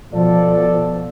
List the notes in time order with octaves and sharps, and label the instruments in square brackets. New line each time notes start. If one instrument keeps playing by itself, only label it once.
[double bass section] B2 F3 [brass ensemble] A4 D5